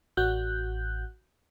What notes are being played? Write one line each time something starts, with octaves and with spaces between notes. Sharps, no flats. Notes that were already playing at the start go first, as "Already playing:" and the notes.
A1 F#4 F#6 G6